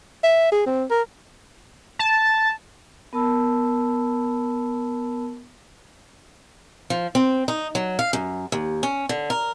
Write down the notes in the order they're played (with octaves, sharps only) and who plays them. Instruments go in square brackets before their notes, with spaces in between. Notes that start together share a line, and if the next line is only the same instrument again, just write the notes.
[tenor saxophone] E5
G#4
C4
A#4
[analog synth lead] A5
[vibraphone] B3 A#4 A5 B5 E6
[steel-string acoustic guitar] F3
C4
D#4
F#3
F5
F#2
D#2
C#4
D3
A#4